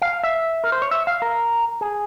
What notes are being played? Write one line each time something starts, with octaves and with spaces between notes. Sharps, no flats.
F5
E5
A#4
C5
C#5
E5
F5
A#4
G#4